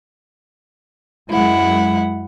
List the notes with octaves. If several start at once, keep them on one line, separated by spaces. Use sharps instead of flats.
F#2 G#3 E4 F#5